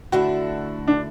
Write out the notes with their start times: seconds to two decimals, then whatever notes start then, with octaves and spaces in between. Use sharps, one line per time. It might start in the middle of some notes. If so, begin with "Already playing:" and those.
0.12 D2 D3 A3 E4 F#4
0.88 D4